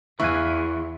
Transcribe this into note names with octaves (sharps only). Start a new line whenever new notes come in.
E2 E3 E5 F5 G#5 C#6 F#6